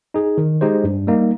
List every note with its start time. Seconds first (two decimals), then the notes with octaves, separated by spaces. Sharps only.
0.14 D#4 G#4
0.38 D#3
0.61 G#3 D#4 G4 C5
0.84 G2
1.07 G3 A#3 D#4